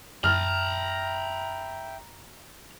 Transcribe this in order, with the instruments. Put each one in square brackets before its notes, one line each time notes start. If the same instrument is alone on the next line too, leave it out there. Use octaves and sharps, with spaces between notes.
[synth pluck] F#2 [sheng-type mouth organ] E5 G5 [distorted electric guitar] A#5 B5 [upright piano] F6